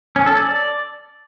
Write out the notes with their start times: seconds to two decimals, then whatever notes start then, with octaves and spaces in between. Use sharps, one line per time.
0.16 C#4
0.26 A4
0.37 D5